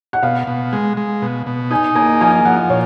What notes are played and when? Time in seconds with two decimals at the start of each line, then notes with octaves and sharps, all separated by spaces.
0.13 F#5
0.23 B2 F5
0.47 B2
0.73 G#3
0.97 G#3
1.22 B2
1.46 B2
1.71 D#4 G#5
1.95 A#3 G#5
2.21 F3 G#5
2.45 F3 F#5
2.70 A#2 C#5